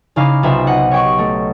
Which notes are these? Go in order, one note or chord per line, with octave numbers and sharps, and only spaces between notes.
C#3 D#4 E4 F5 D6
B1 C3 F4 F#4 C5 E5
D#5 F#5
C#5 G5 C#6
A3